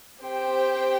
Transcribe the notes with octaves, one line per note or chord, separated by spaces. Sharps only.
C4 G4 C5 G5